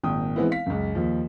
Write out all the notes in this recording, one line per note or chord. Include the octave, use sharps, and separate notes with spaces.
G#1 A#2 G5 D#6
E3 G#3 B3 C4 E4
F5 B6
C#2 F#2
D#2 F3